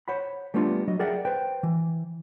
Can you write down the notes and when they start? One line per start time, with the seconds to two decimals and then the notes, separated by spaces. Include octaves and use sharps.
0.08 C5 C#5 F#5 B5
0.54 G3 A3 B3 D4 F4
0.88 F#3 D#5
0.99 G#4 A#4 D5 E5 F#5 G5
1.25 B4 C5 G5
1.63 E3